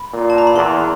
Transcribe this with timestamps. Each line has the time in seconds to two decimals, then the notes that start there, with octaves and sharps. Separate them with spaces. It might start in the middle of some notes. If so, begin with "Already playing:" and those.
Already playing: B5
0.13 A#2
0.30 A5
0.38 A#5
0.47 B5
0.55 E2 C6